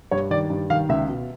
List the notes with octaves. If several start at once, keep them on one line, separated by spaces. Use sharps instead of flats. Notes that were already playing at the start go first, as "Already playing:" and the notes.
G2 C#5
D#3 D5
G2
D#3 F5
C#2 E5
B2